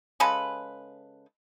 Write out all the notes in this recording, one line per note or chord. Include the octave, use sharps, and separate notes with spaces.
C#3 G#3 A4 B4